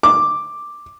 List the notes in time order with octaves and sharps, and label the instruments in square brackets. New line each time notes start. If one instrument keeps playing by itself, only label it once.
[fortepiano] D6